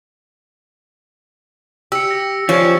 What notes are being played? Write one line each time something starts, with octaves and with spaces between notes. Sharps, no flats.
G4 E6 C#7
A#6
F3 C#4 G4